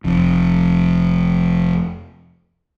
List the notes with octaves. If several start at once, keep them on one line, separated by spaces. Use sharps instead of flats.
F1 F2